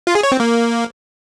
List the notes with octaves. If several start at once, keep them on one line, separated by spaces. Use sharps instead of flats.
F4
G#4
C#5
C4
A#3